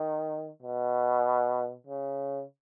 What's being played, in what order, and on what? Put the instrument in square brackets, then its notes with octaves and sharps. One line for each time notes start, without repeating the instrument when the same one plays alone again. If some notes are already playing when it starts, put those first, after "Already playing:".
Already playing: [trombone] D#3
B2
C#3